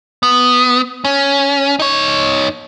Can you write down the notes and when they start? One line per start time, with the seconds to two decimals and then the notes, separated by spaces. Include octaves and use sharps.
0.23 B3
1.05 C#4
1.79 D#4 C#5